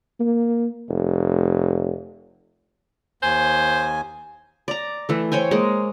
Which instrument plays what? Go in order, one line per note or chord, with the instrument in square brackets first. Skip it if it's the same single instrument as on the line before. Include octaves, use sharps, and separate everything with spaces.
[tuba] A#3
F1
[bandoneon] D#2 G#5 [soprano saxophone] C5
[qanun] D5 A#5
E3 A3
C5 C#5 G5 G#5
G#3 A#3